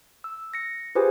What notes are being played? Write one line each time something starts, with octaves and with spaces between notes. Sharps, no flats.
E6
A#6 C#7
F4 G4 G#4 B4 C5 G#5